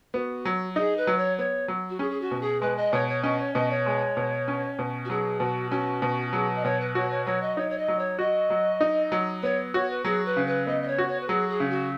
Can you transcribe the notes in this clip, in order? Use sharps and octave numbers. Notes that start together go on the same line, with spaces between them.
B3 F#4
F#3
D#4 G#4
B4
F#3
C#5
B3 C#5
F#3
F#4
C#4 G#4
G#4
F#4
B2
G#4
G#3 B4
D#5
B2 C#5
C#5
C#4 D#5
C#5
B2 D#5
C#5
G#3
B2
C#4
B2
F#4
F#3 G#4
B2 F#4
C#4 F#4
B2
F#3 G#4
D#5
B2 C#5
B4
F#4 C#5
C#5
F#3 C#5
D#5
D#4 C#5
C#5
D#5
F#3
C#5
F#4 D#5
F#3
D#4
F#3
B3 C#5
F#4 C#5
B4
F#3 G#4
B4
C#3
B4
B3 D#5
D#5
C#5
F#4
C#5
B4
F#3 G#4
G#4
C#3
F#4